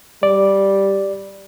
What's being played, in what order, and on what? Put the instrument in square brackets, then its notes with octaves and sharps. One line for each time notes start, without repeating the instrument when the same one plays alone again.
[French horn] G3 [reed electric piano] D5